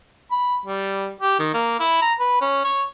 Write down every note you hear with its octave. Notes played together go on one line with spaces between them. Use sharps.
B5
G3
G4
D#3
A#3
E4
A#5
B4
C#4
C#5